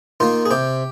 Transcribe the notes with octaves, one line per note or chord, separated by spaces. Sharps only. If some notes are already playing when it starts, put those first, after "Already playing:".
D#3 A#3 F4
G#4
C3 G4